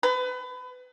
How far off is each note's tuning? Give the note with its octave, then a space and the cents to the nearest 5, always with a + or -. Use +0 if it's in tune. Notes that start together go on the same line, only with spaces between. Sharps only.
B4 +30